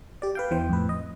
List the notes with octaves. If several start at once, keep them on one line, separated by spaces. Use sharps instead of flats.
G4 D5
B4 F5 G5
E2 E3 C5 G5
F2 A2 B4
D#5